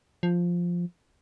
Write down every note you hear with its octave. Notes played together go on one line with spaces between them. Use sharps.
F3